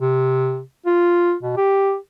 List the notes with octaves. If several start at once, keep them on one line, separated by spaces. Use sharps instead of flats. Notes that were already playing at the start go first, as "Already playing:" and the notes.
C3
F4
B2
G4